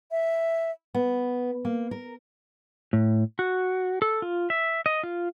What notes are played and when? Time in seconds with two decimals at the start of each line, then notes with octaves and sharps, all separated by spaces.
0.11 E5
0.94 B3
1.65 A#3
1.91 A#4
2.93 A2
3.39 F#4
4.02 A4
4.22 F4
4.50 E5
4.86 D#5
5.03 F4